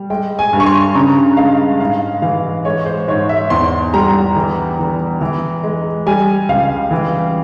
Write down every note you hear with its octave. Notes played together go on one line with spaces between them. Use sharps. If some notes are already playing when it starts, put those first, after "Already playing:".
Already playing: G3
G#3 G5
G#5
G2
C#6
C6
C#3 A#5
G#3 F5
G#2 F5
E3 F5
G#3 C#5
C5
G#2 C#5
E5
E2 C6
G3 A#5
E3
E3
E3
G#3
G3 G#5
C#2 F5
E3